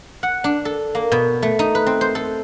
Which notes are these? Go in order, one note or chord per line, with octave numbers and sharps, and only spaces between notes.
F#5
D4
A4
A#3
B2
A3
D#4
B4
C4
C5
A4